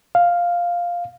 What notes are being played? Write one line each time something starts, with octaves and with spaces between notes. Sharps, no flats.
F5